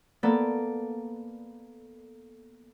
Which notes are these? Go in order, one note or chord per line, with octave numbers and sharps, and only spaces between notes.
A#3 B3 A4 D5